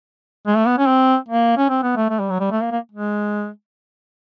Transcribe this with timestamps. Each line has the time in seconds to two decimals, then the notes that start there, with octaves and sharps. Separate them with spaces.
0.47 G#3
0.57 A3
0.67 B3
0.78 C#4
0.88 C4
1.28 A#3
1.57 C#4
1.69 C4
1.82 B3
1.96 A3
2.10 A3
2.20 G3
2.30 F#3
2.40 G3
2.51 A3
2.61 A#3
2.72 A#3
2.91 G#3